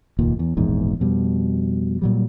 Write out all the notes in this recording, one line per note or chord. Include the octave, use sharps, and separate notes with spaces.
F1 D#2 A#2
E2
E1 A#1 E2 G#2
F2 B2 G3
A#2 F#3 G3